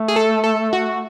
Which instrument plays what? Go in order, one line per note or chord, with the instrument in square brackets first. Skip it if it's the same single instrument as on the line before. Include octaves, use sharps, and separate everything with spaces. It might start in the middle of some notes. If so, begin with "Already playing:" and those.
Already playing: [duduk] A3
[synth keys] G#4
A4
A4
F#4